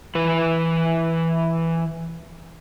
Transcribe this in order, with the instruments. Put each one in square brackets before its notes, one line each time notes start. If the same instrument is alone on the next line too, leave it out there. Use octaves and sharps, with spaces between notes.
[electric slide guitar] E3 B4